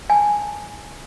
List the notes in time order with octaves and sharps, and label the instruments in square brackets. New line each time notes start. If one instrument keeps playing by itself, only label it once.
[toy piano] G#5 A5